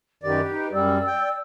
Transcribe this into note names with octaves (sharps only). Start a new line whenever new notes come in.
F#2 D#3 G4 B4 D5
D#4
F#2 G3 D5 E6
G5